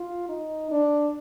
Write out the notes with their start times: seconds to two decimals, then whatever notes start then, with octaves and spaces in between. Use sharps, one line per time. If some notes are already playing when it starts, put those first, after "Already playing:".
Already playing: F4
0.29 D#4
0.71 D4